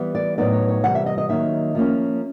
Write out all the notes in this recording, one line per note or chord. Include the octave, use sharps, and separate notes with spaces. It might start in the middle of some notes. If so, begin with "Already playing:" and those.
Already playing: E3 G3 B3
D5
A2 F#3 B3 D#4 D5
C#5
C#5
C3 E3 G3 F#5
E5
D#5
D#5
D#3 F#3 A#3 D#4 E5
F3 A#3 C#4